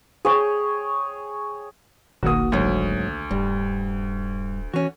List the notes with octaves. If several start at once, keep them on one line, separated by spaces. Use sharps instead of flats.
G#4 C#5 G5
F1 B1 D#3 A#3 F#4 D#6
D2 G#2 F#3
D#1 G2
E3 C#4 F#4